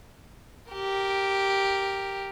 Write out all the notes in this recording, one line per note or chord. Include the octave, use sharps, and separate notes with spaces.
G4 A#4